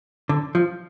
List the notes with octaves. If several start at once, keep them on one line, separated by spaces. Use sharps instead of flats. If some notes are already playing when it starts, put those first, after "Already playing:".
D3
F3